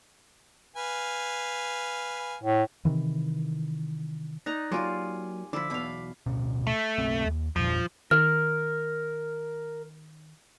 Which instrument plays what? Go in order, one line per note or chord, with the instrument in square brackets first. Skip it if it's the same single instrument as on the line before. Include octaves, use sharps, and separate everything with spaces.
[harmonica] B4 F5 G#5
[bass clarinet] A2
[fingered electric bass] C3 D#3 E3
[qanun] D#4 A#5 [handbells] D5 F#6 A#6
[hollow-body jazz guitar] F#3 A#3 D5 [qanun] F4 [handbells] G4 G#5
[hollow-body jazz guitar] D3 F3 [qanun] E4 [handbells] D6 B6
[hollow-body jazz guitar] B1 E2 B2 [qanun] F5 B5
[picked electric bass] D1 B2 C#4
[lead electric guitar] A3
[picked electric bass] F#1 B1 C4
D#2
[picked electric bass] E2 G2 A#2 [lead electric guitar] F3
[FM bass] D#3 [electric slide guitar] A#4 [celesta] F6